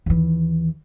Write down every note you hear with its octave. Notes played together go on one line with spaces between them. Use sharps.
D#2 E3